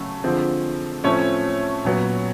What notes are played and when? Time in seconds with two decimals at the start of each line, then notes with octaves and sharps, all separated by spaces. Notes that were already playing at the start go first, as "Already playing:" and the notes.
Already playing: C#3 F#3 A3
0.24 D3 F3 G#3 C4
1.04 A2 F3 A3 C4 C#4 C#5
1.85 A#2 F#3 B3